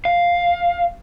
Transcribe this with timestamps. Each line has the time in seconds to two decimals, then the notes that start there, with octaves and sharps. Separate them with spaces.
0.05 F5